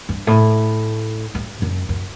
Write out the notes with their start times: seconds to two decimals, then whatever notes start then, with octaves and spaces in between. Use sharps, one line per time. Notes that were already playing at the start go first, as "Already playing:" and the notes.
0.09 G2
0.27 A2
1.35 G2
1.62 F#2
1.89 F#2